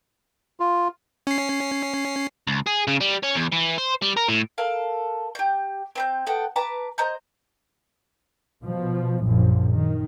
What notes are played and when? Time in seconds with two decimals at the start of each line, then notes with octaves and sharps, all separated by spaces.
0.60 F4
1.27 C#4 C7
2.47 C#2
2.66 G#4
2.87 C#3
3.01 G3
3.23 C#4
3.36 E2
3.53 E3
3.78 C5
4.02 G3
4.17 A#4
4.28 A2
4.58 A4 A#4 F5
5.35 G4 G6
5.95 C4 B5 G6
6.26 B3 A4 F#5 G5
6.56 B4 A5 A#5 D6
6.98 C5 D#5 A#5 G6
8.63 B2 F3
9.24 A#1 F#2 F3
9.72 D#3